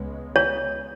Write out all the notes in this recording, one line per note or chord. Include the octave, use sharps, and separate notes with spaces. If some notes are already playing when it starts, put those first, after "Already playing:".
Already playing: C#2 C#3 G#3 B3
C#5